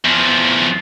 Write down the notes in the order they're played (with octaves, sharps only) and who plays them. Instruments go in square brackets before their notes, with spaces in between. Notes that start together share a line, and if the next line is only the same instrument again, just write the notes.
[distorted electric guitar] E2 F3